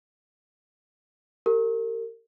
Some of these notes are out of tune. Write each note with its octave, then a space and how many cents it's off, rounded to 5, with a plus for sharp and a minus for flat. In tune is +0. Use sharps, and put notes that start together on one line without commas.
G4 +0 A#4 -35